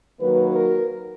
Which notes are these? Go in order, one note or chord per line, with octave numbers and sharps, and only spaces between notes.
D#3 F#3 A#3 B4
A#4